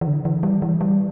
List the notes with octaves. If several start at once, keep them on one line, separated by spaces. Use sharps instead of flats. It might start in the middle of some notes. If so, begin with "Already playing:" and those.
E3
D3
E3
G3
E3
G3